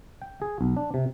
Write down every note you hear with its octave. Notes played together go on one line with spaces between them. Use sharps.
G5
G#4
B1
D4
C3